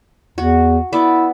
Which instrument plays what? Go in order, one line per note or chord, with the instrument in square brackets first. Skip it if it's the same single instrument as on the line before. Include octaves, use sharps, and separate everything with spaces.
[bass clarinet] E2 [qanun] F#4
[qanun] B3 D5 [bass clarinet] E4